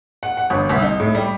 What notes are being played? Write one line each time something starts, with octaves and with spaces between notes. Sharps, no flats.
F#5
F#5
G1
C2
D#4
A2
G3